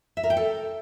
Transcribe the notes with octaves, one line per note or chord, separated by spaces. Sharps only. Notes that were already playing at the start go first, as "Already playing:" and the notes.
E5
A#4
G5
A4